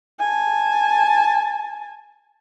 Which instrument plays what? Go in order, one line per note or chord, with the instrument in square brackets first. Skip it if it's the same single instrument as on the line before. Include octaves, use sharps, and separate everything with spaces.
[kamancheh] G#5 A5